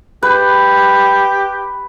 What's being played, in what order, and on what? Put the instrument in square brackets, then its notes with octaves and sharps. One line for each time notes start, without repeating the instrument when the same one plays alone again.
[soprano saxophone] G4 [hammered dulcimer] B4